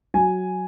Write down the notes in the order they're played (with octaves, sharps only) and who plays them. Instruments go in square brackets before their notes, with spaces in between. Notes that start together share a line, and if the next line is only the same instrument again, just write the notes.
[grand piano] F#3 G#5